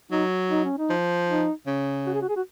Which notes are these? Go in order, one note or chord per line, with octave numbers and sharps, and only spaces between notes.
F#3 D#4
D#4
C#4
D#4
F3
D#4
C#3
F#4
G#4
F#4
G#4
F#4